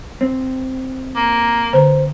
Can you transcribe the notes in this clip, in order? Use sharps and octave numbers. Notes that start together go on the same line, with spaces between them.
C4
A#3
D3 B4 C5